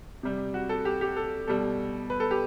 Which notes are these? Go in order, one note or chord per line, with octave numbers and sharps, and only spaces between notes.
C3 G3
F#4
A4
G4
G4
A4
B2 G3 A4
B4
A4
G4